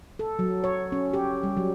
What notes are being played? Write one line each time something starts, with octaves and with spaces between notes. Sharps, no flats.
A4
F#3
C#5
C#4
G4
G3
F#3